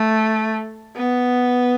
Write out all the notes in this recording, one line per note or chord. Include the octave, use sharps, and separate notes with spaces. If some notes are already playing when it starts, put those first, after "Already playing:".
Already playing: A3
B3